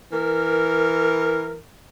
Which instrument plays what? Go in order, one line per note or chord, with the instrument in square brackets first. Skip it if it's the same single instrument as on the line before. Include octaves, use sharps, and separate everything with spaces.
[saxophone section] E3 A#4